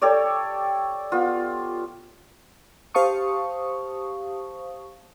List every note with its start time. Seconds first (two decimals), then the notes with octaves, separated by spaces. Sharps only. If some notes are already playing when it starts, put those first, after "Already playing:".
0.01 G4 A4 C#5 D5
1.12 B3 F4
2.94 G4 C5 F5 A5 C#6 D#6